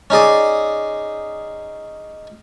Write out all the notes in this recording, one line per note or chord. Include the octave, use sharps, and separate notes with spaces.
C#4 D#4 G#4 D5